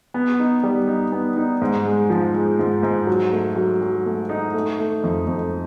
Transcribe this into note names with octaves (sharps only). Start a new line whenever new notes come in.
B3
D#4
G3
D#4
B3
D#4
G#2
G#3
F3
G#3
G#2
G#2
F#3
A3
F#3
F#3
A3
D#4
A3
A3
F2
F2